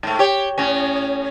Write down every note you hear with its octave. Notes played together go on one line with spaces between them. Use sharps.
G#2 A3
G4 C#5
A2 C#4